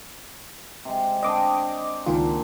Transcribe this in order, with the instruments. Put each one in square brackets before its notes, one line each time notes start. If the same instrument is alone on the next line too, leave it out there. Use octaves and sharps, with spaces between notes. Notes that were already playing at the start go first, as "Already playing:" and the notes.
[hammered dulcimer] C3 G#3
[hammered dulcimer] C4 D4 C5 [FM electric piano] D#5 D6 D#6
[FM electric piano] C#2 D#3 F4 [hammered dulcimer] A#2 D3